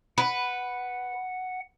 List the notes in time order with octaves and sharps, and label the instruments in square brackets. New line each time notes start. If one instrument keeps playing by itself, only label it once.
[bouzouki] B4 [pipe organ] F#5